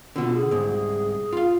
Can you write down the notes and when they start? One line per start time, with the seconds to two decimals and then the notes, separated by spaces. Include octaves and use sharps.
0.16 B2 D3 F4
0.34 G#4
0.51 C2 G#2
1.32 F4 F5